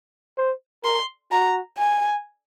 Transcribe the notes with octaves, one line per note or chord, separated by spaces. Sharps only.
C5
A#4 C6
F#4 A#5
G#5